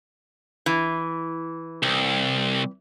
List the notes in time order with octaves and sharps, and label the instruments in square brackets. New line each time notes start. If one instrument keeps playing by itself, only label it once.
[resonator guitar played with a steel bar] E3
[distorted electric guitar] C2